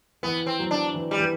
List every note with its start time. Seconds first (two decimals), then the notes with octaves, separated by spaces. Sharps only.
0.23 E3 B3
0.47 C4
0.59 F#3
0.71 D4
0.94 E3
1.11 G3
1.19 E3